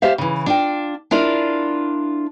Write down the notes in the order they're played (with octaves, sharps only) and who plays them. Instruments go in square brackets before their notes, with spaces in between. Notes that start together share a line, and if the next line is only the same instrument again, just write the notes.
[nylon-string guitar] G4 C5 E5 F5
C#3 E3
D4 F4 G5
D4 E4 F4 A#4 D5